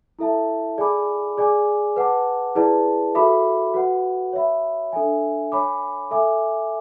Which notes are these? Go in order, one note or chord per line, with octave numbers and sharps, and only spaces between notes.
E4 A4 E5 A5
G#4 D5 G#5 B5 D6
G#4 D5 G#5 D6
B4 F#5 A5 D6
E4 G#4 B4 D5 A5
F#4 A4 E5 B5 D6
F#4 B4 F#5
C#5 E5 B5
D4 A4 E5 G#5
C#5 G#5 B5 D6
A4 E5 G#5 D6